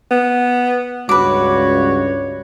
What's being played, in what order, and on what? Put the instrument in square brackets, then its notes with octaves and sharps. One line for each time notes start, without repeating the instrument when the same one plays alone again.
[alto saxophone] B3
[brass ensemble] C#2 G2 C#5 [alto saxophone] F#4 [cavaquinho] B4 D6